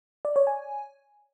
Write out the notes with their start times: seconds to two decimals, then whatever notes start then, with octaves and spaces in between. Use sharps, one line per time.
0.25 D5
0.36 C#5
0.47 G#5